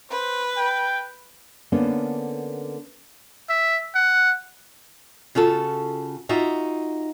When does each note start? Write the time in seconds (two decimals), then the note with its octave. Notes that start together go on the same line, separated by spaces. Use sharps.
0.10 B4 C5
0.56 G5
1.72 D3 A#3 B3 C#4 D4
3.49 E5
3.95 F#5
5.35 C#3 F4 F#4 A4
6.29 D#4 F4 F#4 E5